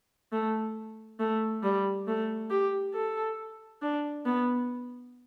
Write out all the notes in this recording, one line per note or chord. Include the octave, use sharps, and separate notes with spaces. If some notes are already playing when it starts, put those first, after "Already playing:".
A3
A3
G3
A3
G4
A4
D4
B3